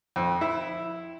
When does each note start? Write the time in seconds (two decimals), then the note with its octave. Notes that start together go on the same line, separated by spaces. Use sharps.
0.16 F2
0.41 E4